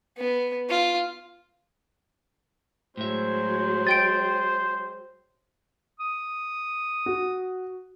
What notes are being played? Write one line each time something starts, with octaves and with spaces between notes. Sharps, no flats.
B3
F4
A2 F#3 G#3 C5 E5
D#5 G5 A6 D7
D#6
F#4